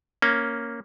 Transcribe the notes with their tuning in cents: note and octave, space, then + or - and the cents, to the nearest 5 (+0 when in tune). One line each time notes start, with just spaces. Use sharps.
A#3 +0 C#4 +0